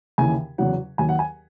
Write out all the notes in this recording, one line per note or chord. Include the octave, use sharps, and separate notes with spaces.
D#2 C#3 E3 G#5
E2 C#3 F#3 F#5
D#2 D#3 F#3 G#5
F#5
G#5